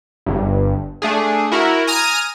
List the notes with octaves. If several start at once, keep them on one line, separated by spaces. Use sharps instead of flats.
G1 G2
A3 D4 G#4
E4 F#4 A#4
G#5 A#5 D#6 F6 D#7